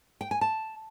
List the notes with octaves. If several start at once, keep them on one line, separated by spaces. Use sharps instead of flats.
G5
G#5
A5